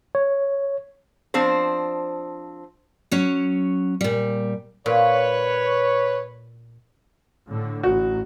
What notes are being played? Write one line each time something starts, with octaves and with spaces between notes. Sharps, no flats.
C#5
F3 C4 D4 C5
F#3 C#4
A#2 G3
A#2 B4 C#5
A2 D3
A1 F#4